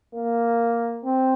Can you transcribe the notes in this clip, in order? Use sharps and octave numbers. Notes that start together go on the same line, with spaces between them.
A#3
C4